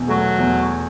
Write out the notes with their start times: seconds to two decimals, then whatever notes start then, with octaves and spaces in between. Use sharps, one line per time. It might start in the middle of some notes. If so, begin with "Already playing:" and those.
Already playing: E2 B2
0.08 F#3 A3
0.39 E2